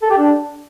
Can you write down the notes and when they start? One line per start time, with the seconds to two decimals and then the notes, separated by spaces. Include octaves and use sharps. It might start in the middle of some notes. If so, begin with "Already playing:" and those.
0.03 A4
0.10 G4
0.18 D4